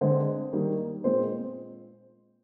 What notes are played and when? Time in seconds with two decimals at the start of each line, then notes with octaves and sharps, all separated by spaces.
0.01 D3 G#3 C4 C5
0.53 D#3 G3 A#3
1.04 A#2 G#3 C4 C5